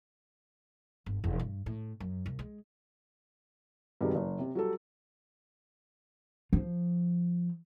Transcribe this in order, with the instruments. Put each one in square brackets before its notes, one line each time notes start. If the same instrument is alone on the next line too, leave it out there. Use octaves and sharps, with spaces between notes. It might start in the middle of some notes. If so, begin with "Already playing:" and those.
[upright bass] G1
E1
G2
A2
F#2
C2
G#3
[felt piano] G2 C3 D#3 F#3 G#3
F#1
C3
F#3 G3 A4
[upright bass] F3